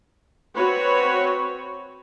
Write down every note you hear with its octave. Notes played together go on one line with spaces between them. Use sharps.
C4 F#4 B4 C#5